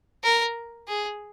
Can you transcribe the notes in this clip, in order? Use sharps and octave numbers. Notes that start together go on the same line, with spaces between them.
A#4
G#4